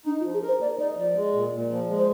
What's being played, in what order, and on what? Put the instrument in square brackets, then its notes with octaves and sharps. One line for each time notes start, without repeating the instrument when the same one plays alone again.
[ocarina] D4 [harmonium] D#4
[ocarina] F4
[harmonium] F3
[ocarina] G#4
[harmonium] A#4 [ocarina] C5
[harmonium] A#3 [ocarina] D5
[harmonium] D#4 [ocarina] D5
[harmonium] F3 [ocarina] D5
[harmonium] G#3
A#2
A#2
F3
G#3
[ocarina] C5